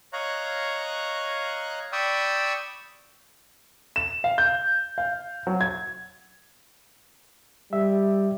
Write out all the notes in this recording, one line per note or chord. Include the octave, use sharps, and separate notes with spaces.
C#5 D#5 F5 A#5 C#6 F#6
D5 G5 B5 C#6 D#6 E6
E7
F5
G6
F5
F#3
G#6
G3 E5